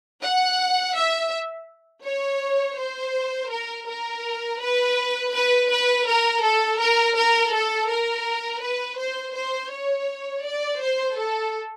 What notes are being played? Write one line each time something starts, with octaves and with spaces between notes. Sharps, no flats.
F#5
E5
C#5
C5
A#4
A#4
B4
B4
B4
A#4
A4
A#4
A#4
A4
A#4
B4
C5
C5
C#5
D5
C5
A4